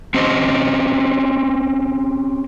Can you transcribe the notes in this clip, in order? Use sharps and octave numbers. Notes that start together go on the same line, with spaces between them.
C4 C#4 G4 C5 D#5